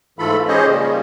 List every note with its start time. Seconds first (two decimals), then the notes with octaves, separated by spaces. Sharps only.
0.19 G#2 E3 A3 F4 A4 B5
0.48 C#4 G4 G#4 C5 C#5 D#5
0.67 A#2 C#3 G3